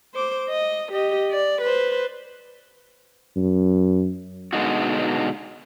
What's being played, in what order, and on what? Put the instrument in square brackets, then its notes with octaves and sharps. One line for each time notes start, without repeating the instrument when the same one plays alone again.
[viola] C5 D6
D#5
G4 D#5
D5
B4 C5
[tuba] F#2
[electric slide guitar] B2 D3 G#3 D#4 F#4